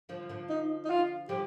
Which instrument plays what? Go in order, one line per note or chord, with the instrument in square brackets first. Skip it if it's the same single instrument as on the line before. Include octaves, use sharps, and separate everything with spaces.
[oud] D3 F3
D3 F3
[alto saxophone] D#4
D#4
F4
[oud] D3 F3 [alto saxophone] G4